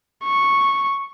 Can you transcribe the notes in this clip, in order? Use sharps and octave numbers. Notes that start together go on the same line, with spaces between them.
C#6